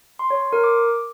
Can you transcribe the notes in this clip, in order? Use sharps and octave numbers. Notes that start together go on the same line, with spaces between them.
C6
C#5
C6
A#4
D6